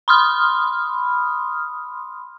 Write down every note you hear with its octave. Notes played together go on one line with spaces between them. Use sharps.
B5 C6 D#6 F6